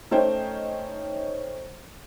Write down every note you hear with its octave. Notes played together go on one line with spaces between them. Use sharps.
A3 C#4 D#4 C5 C#5 G5